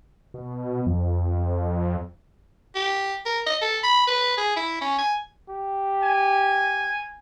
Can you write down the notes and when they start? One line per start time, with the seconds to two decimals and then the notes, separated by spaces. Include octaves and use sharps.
0.34 B2
0.86 F2
2.75 G4
3.26 A#4
3.46 D#5
3.62 A4
3.83 B5
4.07 B4
4.38 G#4
4.56 E4
4.81 C#4
4.99 G#5
5.49 G4
6.02 G#5